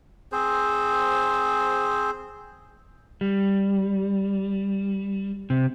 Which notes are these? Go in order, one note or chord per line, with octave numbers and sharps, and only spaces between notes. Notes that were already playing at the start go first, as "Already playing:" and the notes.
C4 G#4 C5
G3
C3